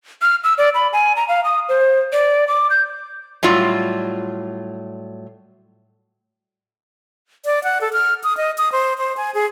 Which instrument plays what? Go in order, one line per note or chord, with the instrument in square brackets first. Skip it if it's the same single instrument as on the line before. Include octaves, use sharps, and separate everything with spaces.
[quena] F6
E6
D5
B5
G#5
A#5
F5
D#6
C5
D5
D6
G6
[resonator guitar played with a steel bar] A2 F#3 G3 F4
[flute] D5
F#5
A4
F6
D#6
D#5
D#6
C5
C5
G#5
G#4